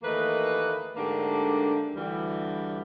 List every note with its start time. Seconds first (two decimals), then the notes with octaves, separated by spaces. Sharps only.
0.03 D#2 E3 A3 A#3 B4 D#5
0.97 G#2 D3 A3 A#3 D4 G4
1.95 D2 E3 G3